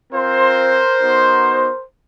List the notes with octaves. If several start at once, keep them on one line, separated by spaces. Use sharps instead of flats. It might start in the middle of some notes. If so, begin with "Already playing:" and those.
C4 F4 A#4 C5
B3 D#4 F#4